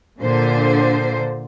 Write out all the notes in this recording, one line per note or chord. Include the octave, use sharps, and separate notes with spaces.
A#2 D3 C5